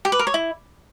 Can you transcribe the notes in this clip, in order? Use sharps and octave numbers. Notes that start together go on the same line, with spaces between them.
G4
B4
A#4
C#5
E4